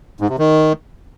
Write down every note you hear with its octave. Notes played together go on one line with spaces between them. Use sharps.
G#2
C3
D#3